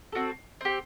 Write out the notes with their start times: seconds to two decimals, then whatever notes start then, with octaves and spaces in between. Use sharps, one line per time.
0.12 C4 F#4 A4
0.61 C4 G4